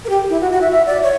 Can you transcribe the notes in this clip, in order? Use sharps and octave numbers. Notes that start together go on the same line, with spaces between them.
A#4
G4
E4
F#4
F#4
E5
E5
D5
C#5